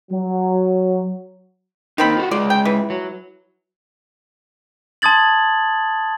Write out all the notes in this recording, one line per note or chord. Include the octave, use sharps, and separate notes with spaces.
F#3
D#3 A#3 C4 D#4 B5
F4 F#4
G#3 F4 G#4 D5
G5
E3
F#3
A5 C6 D#6 G#6 A6 F#7